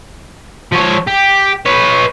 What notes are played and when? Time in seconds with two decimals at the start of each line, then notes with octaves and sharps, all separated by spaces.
0.72 F3 C#5
1.07 G4
1.66 B4 C#5